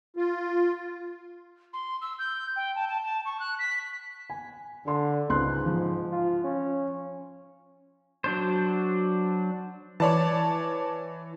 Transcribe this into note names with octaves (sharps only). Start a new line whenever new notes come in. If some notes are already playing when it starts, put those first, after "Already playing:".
F4
C6
E6
G6
G5
A5
A5
A5
C#6
F#6
B6
G#5
D3 A4 C6
C#2 G#2 C6 F#6
F3
F4
C#4
F#3 D4 C5
E3 C#5 D5 A5